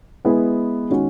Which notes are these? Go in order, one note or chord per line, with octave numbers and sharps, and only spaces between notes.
G#3 B3 E4 G#4 B4
D#3 G#3 C#4 F#4